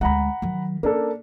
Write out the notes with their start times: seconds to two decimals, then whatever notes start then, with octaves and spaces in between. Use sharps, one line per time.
0.01 D2 G#3 F#5 A#5 B5
0.42 D#3 F#3
0.83 A#3 C#4 D4 A4